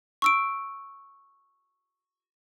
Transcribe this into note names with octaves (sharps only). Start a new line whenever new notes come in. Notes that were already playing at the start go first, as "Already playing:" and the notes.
C#6 E6 D7